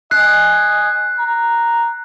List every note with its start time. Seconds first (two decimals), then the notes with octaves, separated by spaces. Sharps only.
0.11 D#5 G#5 F#6 C7
1.19 A#5